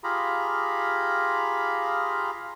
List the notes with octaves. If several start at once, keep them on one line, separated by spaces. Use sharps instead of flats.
F4 G4 G#4 F5 A#5 B5